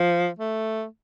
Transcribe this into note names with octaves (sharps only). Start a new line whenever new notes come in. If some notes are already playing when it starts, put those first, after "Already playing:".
Already playing: F3
A3